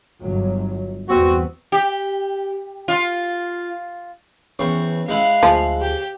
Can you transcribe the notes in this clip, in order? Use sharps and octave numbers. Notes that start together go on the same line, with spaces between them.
G1 F#3
E2 G3 B3 C4 F#4
G4
F4
E2 C4 C#4 B4 C#6
G#3 E4 F5 F#5
D2 F3 G#4
G4